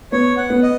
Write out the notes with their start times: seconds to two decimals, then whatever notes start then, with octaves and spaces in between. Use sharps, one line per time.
0.12 B3 C#5
0.37 F#5
0.50 B3
0.63 D#5